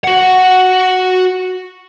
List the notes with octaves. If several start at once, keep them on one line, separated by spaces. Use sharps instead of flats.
F#4 F#5